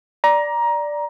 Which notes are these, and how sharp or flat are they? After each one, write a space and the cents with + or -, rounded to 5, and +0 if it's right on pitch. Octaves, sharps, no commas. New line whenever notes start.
D5 +0 A#5 +15